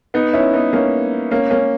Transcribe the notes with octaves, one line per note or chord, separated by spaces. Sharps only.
B3 D#4
C#4 E4
B3 D#4
A#3 C#4
A#3 C#4
A#3 C#4